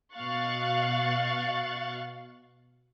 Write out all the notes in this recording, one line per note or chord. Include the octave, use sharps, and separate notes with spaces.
B2 F5 C#6 F#6 A6